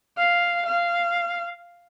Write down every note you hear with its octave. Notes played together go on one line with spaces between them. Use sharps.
F5
F5